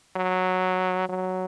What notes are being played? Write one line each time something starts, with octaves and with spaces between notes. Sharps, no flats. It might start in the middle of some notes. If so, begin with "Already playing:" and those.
F#3
F#3